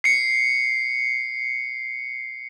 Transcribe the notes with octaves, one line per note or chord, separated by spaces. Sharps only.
C7 C#7